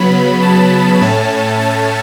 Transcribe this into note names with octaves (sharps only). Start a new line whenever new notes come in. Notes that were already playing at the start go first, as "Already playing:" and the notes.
Already playing: C#3 F#3 B3 B5
A5
A2 A3 C#4
A5